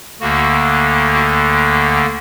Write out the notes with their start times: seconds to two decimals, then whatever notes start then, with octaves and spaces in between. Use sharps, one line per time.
0.21 D2 D3 A#3 F#4
1.13 F#4